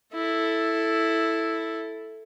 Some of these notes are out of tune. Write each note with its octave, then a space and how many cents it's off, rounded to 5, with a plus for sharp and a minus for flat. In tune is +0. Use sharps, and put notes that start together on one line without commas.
E4 +0 A4 +0